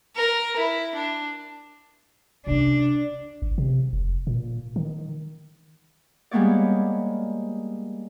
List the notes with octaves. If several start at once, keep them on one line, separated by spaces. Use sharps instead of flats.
A#4
E4
D4
C3 C#4 D4
G#1
C3
F1
A#2
D#3
G3 G#3 A#3 B3 C#5 D5